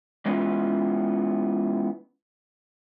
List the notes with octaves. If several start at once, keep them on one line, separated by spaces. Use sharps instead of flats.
E3 G#3 B3 C#4 E4 F4